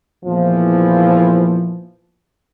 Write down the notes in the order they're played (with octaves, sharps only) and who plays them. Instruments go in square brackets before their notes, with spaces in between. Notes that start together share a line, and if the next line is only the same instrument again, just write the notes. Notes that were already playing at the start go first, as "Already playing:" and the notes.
[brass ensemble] E2 A#2 E3 F3